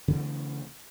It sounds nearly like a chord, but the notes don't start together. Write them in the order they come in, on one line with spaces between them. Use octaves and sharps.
C#3 E3 C4 A3